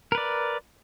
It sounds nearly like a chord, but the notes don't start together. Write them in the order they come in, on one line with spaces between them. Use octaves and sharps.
A#4 B4 D5